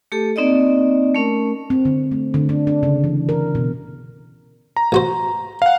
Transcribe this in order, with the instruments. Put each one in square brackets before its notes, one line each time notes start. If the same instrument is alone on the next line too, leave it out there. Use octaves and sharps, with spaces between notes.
[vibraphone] A3 G4 A4
A#3 C4 D#4 D5 D#5
A3 C#4 A#4
[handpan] C4
D3
A3
D3
D4
D4
C#3
E3
A#4
B2
[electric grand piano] A#5
[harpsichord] A1 F#4 C5
[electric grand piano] F5 F#5